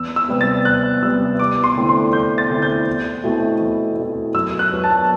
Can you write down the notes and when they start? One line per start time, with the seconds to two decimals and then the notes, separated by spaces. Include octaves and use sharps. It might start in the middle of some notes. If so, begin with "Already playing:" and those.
Already playing: E2 E6
0.16 E6
0.29 C3 G3 B3
0.41 A6
0.65 E2 F#6
1.03 C3 G3 B3 E6
1.39 E2 D6
1.64 C6
1.76 D3 A3 C4 E4
1.89 C6
2.13 E2 G6
2.38 A6
2.50 D3 A3 C4 E4
2.62 G6
2.87 E2
3.24 B2 A3 C4 E4
3.60 E2
3.98 B2 A3 C4 E4
4.34 F#2 E6
4.59 F#6
4.72 F#3 B3 D4
4.84 A5